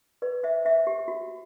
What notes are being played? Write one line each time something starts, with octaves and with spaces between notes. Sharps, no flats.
B4 D5
C5 E5
C5 E5
G4
F#4